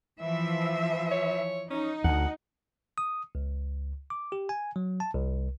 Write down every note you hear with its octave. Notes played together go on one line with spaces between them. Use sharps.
E3 F3 E5
C#5
C#4 D#4
D2 F#5
D#6
C#2
D6
G4
G#5
F#3
A5
C2